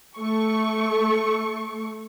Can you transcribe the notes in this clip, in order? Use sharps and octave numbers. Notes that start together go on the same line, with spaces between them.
A3 C#6